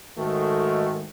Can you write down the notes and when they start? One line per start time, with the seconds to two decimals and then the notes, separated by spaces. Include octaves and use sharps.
0.18 G#2 D#3 A3 F#4 A4